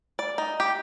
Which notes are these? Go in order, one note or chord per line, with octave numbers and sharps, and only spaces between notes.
D5
D#4
G4